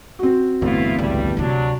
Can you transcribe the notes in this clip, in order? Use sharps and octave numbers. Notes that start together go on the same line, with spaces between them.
C4 F#4
G1 E2 A2 B3 D4 E4 F4
C#2 G2 G3
D2 C3 F#3 D4